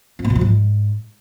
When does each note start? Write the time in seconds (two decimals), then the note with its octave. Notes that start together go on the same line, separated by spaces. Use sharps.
0.19 F2
0.25 A#2
0.30 B2
0.36 F3
0.41 G#2